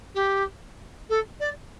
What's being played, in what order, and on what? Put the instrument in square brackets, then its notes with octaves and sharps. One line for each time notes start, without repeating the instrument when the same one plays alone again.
[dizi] G4
A4
D5